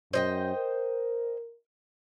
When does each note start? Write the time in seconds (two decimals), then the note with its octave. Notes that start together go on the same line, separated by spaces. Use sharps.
0.13 F#2 C5 D#5 G5
0.56 A#4